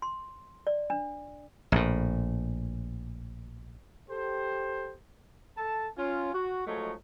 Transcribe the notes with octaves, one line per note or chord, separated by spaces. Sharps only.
C6
D5
D4
A#1 A2
G4 A4 C5
A4 A5
C#4 F4
F#4
F3 F#3 G#3 A3 D#4 C#5